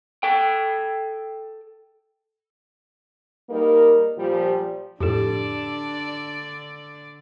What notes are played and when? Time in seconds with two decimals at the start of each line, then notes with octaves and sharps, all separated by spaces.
0.23 A4 G5
3.49 G3 A#3 D#4 A#4
4.18 A#2 F3 G3 G4
5.00 F2 A2 D3 D4 G4 A4 D5